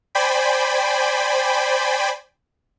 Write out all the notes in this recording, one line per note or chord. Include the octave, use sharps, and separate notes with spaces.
C5 D5 G5 G#5 B5